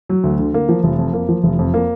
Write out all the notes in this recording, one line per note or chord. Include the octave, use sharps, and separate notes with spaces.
F#3
D2
D3
A#3
F3
F1
F2
A#3
F3
F1
F2
A#3